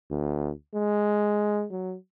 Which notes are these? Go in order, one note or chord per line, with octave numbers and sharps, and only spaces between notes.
D2
G#3
F#3